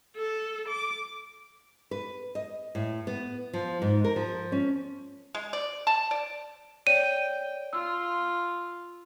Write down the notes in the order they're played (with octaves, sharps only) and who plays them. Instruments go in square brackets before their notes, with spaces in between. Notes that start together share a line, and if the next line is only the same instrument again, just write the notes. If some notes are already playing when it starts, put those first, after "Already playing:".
[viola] A4
D6
[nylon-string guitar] B4
D#5
A2
B3
F3
G#2
A#4
F3
C#4
[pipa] G#3
D5
A5
D5
[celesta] C#5 D5 [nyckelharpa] G5 [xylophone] D#7
[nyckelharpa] F4 [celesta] E6